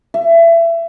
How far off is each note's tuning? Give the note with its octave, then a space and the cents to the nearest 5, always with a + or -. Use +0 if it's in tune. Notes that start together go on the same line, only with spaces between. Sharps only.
E5 +25